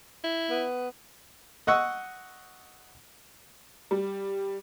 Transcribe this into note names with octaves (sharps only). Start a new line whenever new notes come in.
E4
B3
D#5 F#5 C#6 E6
G3